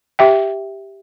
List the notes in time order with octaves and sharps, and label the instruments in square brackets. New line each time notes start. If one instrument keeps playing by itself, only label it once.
[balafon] G4 E5 G5